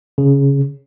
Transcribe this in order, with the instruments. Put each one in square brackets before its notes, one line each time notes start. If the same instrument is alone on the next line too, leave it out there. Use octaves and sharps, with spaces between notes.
[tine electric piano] C#3